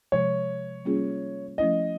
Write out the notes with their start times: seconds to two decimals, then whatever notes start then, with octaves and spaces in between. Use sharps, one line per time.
0.12 C3 F3 G#3 C#5
0.85 G3 A#3 C#4 F4 G#4
1.58 F3 A3 C#4 E4 D#5